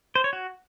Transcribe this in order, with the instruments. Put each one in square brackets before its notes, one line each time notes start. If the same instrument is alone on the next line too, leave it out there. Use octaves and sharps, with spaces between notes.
[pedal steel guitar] C5
C#5
F#4